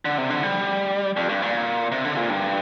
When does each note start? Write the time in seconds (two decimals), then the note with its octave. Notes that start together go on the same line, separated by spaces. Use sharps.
0.05 D3
0.18 C3
0.30 D3
0.43 G3
1.17 F2
1.29 G2
1.42 A#2
1.92 C3
2.05 D3
2.17 A#2
2.30 G2